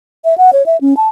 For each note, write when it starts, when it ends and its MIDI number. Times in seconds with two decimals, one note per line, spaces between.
0.25 0.37 76
0.38 0.50 78
0.53 0.65 73
0.66 0.79 76
0.81 0.94 61
0.97 1.09 81